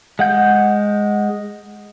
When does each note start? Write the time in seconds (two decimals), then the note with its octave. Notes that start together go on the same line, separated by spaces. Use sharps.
0.19 G#3 F#5 G6